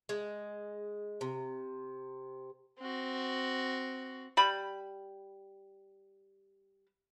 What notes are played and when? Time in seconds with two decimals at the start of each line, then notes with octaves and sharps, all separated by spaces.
0.09 G#3
1.21 C3
2.79 C4 F#4
4.37 G3 B5